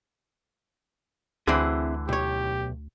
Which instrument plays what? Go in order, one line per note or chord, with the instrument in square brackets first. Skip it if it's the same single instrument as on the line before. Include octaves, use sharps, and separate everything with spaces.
[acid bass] D2 [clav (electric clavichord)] D3 E3 [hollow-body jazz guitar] C4 E4 G#4
[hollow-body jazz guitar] B1 C#5 [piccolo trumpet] G4